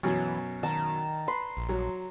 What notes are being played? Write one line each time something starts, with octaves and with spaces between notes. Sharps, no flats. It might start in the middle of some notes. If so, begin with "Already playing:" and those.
F#2 B2 E3 F#3
D#3 A5 A#5 E6
B4 C6
A#1
F#3